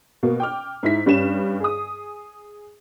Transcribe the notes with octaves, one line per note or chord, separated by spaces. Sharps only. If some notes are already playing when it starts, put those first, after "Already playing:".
B2 A#3
G5 D6 F6
G#2 E4 B6
G2 G3 C#4 E7
G#4 D#6